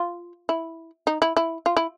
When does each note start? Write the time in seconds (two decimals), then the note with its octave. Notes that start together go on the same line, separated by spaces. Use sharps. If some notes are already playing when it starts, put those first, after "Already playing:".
Already playing: F4
0.49 E4
1.07 D#4
1.22 E4
1.37 E4
1.66 F4
1.77 E4